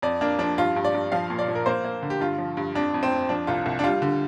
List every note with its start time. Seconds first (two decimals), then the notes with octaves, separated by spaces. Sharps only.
0.02 F2 D5
0.21 A#3 D4
0.39 F3 D4
0.58 G2 F4
0.76 G2
0.84 D5
0.94 G2
1.12 F3 F5
1.30 A#2
1.39 D5
1.48 F3
1.55 A#4
1.66 A#3 C5
1.85 A#3
2.03 D3
2.10 G4
2.21 G2 F4
2.38 F3
2.57 G2
2.75 F2 D4
2.94 F2
3.03 C4
3.11 F2
3.29 F3 D4
3.47 C2 F4
3.66 C2
3.79 D4
3.84 G3 F4
4.02 D3